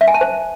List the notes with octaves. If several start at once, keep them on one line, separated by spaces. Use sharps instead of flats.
E5
G#5
A5
C5